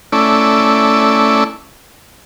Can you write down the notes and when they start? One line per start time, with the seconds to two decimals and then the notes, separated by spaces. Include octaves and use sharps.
0.12 A3 C#4 E4 D5